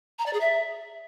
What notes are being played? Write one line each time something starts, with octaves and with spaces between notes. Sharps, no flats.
A#5
D5
G#4
E5